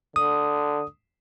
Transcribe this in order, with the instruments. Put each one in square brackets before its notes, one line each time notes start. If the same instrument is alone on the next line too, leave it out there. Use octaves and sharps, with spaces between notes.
[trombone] D3 [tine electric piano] D#6